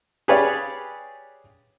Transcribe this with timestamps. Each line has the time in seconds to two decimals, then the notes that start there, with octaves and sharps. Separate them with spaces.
0.28 G4 G#4 B4 C#5 D5 F5